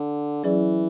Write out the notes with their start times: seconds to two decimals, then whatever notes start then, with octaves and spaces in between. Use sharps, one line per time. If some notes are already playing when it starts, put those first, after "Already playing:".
Already playing: D3
0.43 E3 F#3 C#4 E4 G#4 D5